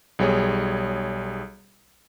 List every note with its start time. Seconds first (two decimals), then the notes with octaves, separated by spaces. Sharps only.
0.19 B1 G3 G#4 C#5